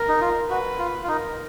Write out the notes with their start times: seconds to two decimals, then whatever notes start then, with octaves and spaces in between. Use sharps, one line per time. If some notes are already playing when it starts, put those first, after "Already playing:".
Already playing: A#4
0.08 D#4
0.21 F4
0.49 F#4 B4
0.79 F4
1.03 F4
1.08 D#4 A#4